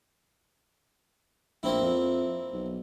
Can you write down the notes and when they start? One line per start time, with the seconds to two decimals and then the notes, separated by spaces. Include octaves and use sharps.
1.63 A#1 A#3 C4 E4
1.82 F2
2.52 B1